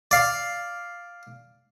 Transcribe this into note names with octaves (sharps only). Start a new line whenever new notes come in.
D5 F5